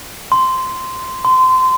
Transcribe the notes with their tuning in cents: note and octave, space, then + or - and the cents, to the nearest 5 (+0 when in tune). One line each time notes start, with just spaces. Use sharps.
C6 -10
C6 -25